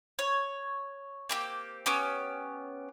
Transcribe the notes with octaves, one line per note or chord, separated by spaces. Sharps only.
C#5
A#3 C4 G4
B3 C#4 G4